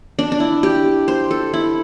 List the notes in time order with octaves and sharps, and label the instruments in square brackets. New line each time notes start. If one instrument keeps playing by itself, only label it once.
[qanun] D4
D4
E4
G4
C5
A4
E4